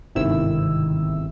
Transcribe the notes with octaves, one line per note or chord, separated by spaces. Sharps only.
G1 G#2 C3 D#3 E4 E6